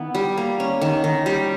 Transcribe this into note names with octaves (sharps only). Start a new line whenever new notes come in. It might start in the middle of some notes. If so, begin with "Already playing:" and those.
Already playing: D#3 B3 E4
G3
A#3
C#4
D#3
D#3
G3